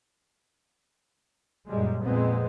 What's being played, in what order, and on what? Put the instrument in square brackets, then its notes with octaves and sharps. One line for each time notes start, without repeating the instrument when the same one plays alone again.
[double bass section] F#2 A#2 G3 G#3
F2 A#2 G#3 B3 C4